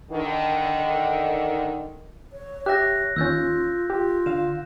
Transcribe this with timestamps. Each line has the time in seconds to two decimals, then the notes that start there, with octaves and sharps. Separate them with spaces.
0.11 D3 D#3
2.33 C#5
2.66 G4 C#5 E5 F#6 A#6
3.16 D#2 C#4 F4 E6 G6 A6
3.90 F4 G4
4.26 D3 F5 E7